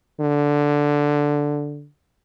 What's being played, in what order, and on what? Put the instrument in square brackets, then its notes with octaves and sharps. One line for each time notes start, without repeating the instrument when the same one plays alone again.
[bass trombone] D3